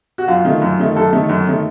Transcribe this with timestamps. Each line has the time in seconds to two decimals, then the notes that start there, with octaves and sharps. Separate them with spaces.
0.18 F#4
0.28 F#2 F4
0.45 D#3 A3
0.62 F#2
0.80 D#3 A3
0.96 F#2 A4
1.13 D#3 A3
1.29 F#2
1.47 D#3 A3